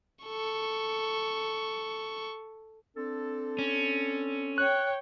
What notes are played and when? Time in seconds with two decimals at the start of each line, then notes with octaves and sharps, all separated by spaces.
0.25 A4 C#6
2.97 C4 D4 A4
3.59 C#4
4.58 C#5 G5 F#6